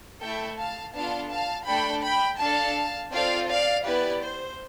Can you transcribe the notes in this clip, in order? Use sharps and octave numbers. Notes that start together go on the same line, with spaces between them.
A3 E4 A4 E5 G5
F5 A5
B3 D4 F4 A4 F5 A5
F5 A5
A3 D4 A4 G5 B5
G5 B5
D4 A4 F5 A5
C4 F4 A4 D5 F5
D5 F5
B3 E4 G4 B4 D5
C5